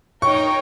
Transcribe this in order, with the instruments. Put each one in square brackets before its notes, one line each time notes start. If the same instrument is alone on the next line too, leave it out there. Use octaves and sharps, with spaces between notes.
[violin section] D#4 A#4 C#5 G5 [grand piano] C#6